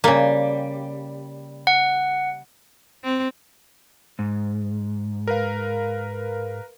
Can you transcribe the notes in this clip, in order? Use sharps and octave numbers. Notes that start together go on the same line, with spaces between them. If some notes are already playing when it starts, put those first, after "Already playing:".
C#3 G3 A#3
F#5
C4
G#2
A#4 B4 F5